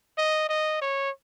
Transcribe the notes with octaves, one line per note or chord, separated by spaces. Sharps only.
D#5
D#5
C#5